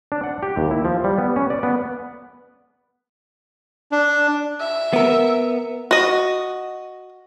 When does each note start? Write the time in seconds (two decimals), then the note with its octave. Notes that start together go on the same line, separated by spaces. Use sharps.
0.12 D4
0.23 F#5
0.43 G4
0.57 D#2
0.71 E4
0.85 F3
1.04 G3
1.18 B3
1.36 C#4
1.50 D5
1.63 B3
3.92 D4
4.60 E5
4.93 B3 A#4
5.91 F#4 D#5